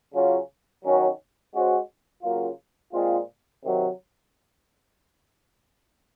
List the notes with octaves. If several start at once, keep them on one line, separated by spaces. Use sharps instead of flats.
C#3 F#3 C#4 F4
D#3 F#3 C#4 F#4
G#3 C#4 F#4 C5
C#3 F#3 A#3 F4
A#2 G#3 C4 F4
C3 D#3 F#3